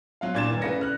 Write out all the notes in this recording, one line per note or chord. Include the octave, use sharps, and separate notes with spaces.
F#3 F4 F5
A#2 D4 G#6 A6 E7
G1 D#3 E7
C#3 A3 B4 D5 A#6 C#7
F6 F#6